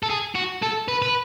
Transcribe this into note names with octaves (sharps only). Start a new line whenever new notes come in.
A4
G#4
F#4
A4
B4
B4